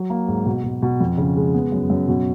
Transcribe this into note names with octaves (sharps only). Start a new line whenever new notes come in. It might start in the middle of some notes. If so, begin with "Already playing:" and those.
Already playing: F#3
A#3
G#2
B2
B2
B2
F2
C#3
G#3
B3
F#2
F#2
B2